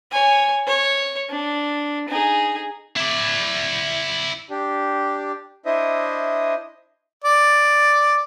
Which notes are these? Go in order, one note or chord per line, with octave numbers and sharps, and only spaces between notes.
C#5 G#5
C#5
D4
D#4 G#4
E4 D5
D4 G4
D4 E4 C5 D#5 E5 D#6
D5